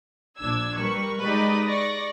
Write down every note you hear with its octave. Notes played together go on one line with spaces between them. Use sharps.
A#1 D4 E6 G#6
G3 A#4 B4 C#6
G#3 D#4 G4 B4 D5 D#5
D5 C#6 A#6